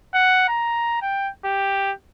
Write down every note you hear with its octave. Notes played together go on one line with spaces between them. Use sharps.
F#5
A#5
G5
G4